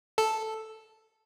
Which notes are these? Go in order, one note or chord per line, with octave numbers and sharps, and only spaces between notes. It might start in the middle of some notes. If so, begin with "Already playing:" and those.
A4